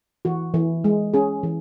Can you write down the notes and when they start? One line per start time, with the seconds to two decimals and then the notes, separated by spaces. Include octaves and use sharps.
0.25 E3 F#4
0.54 E3
0.84 G#3
1.14 C#4 G#4
1.43 E3